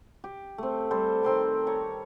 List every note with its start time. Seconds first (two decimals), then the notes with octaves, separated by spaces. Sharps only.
0.24 G4
0.58 A3 C4
0.91 G3 A4 C5
1.23 D#3 C4 C6 D6
1.67 C#5 A#5